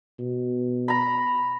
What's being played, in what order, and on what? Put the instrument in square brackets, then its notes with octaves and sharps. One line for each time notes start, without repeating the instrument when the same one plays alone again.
[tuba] B2
[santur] A#5 B5